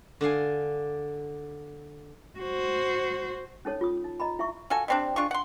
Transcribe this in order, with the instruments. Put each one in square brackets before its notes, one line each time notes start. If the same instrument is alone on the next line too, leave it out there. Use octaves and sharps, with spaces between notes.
[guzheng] D3 D5 F5 G#5
[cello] F#4 C5
[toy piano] C#4 D#4 A4 C#5
F4 D#6
D#4
D#5 A#5 B5
E4 E5 C#6
[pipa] F4 F#4 A4 G#5
G3 C4 D4
D4 F4 G#4 C#6
F#5 C6